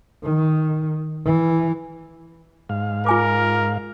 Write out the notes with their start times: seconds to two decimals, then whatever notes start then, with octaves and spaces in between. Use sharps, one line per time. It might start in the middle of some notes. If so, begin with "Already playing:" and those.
0.24 D#3
1.25 E3
2.69 G#2 F5
3.06 F4 A#4 G#5 D6